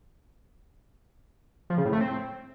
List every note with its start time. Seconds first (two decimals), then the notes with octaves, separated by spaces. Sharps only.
1.70 F3
1.78 C#3
1.85 A2
1.93 A3
2.00 C4